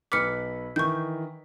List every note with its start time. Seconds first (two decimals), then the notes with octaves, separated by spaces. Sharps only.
0.12 B1 B4 D6 F6 B6 C#7
0.76 D#3 E3 C#6 G6